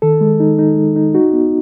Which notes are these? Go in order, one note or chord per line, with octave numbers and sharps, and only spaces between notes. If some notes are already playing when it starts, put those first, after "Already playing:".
D#3 A4
G#3
D#4
D#4
G#3
D#4
D#4 F#4
B3